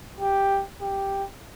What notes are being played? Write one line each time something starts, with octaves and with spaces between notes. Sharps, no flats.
G4
G4